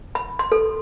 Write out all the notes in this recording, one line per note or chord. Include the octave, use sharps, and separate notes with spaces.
B5
C6
A4